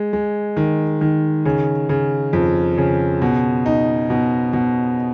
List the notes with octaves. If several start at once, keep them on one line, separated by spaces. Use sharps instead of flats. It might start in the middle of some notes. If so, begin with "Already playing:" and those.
Already playing: G#3
G#3
D#3
D#3
C#3
C#3
F2
C#3
B2
D#4
B2
B2